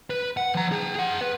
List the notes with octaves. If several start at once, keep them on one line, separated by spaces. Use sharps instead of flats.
B4
F#5
F3 A#5
G#4 G5
G#4 F#5
B4